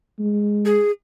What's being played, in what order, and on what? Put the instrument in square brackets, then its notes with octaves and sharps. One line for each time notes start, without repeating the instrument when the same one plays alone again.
[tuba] G#3
[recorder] G#4